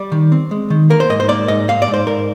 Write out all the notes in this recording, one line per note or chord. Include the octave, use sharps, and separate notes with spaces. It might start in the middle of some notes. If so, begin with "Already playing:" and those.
Already playing: G3 D5
D#3
C4
G#3
D#3
A#3 A#4
C5
G#2 D#5
C5
A#3 D5
G#2 D#5
G#2 F5
D5
G#2
C5
G#2 A#4